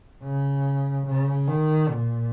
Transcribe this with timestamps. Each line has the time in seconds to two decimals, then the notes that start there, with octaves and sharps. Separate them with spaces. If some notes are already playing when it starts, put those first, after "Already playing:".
0.23 C#3
1.07 C#3
1.48 D#3
1.90 A#2